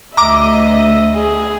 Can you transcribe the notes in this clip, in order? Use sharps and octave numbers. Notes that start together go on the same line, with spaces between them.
D2 D#5 E5 A#5 D6
G#4